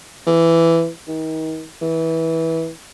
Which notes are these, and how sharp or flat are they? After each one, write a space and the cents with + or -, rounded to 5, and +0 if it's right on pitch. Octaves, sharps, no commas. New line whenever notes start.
E3 +10
D#3 +35
E3 -20